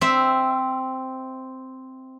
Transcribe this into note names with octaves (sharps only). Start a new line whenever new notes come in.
C4 E5